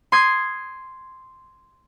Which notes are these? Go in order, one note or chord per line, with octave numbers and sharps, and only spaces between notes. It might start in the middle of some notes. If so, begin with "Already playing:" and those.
C6 D#6 G#6 C7